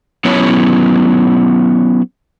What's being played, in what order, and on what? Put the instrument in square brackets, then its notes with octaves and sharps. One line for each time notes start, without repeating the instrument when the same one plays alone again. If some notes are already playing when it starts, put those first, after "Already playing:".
[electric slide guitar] F#3 B3 C#4 E4 C#5